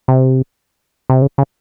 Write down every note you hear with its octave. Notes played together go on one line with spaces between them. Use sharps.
C3
C3
C#3
C#3